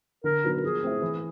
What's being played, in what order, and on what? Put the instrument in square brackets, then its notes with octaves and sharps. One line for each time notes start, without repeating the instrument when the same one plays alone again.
[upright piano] D3 [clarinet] A#4
[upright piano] F#3 B3 D#4
[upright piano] F3 [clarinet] G#4
[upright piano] A3 C4 E4
E3